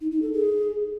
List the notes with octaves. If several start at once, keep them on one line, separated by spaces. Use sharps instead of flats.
D#4
D#4
A4
G#4